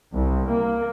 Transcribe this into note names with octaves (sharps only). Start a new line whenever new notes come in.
C2
A#3